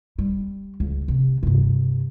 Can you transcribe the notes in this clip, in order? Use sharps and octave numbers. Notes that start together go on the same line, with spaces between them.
G3
C#2
C3
G2 C3